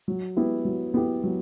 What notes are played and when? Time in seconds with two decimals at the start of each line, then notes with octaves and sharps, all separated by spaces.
0.08 F#3
0.36 B3 E4 G4
0.65 F#3
0.94 B3 E4 G4
1.24 F#3